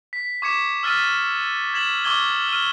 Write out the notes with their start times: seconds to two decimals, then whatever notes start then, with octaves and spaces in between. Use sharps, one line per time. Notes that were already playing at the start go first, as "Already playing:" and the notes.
0.13 B6
0.42 C#6 D6 G#6 B6 C#7 E7
0.83 E6 F6 A6 B6 D#7
1.74 G#6 B6 E7 F#7
2.04 C#6 D6 E6 G#6 G7
2.48 F6 D#7